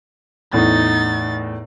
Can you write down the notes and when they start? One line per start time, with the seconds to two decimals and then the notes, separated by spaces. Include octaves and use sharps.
0.53 E2 A2 D#4 A6